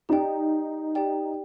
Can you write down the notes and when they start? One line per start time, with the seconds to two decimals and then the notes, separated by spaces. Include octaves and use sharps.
0.09 D#4 G4 D5 G5
0.95 G4 D5 G5